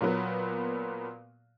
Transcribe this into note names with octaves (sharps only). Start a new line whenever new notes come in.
A#2 F#3 A#3 B3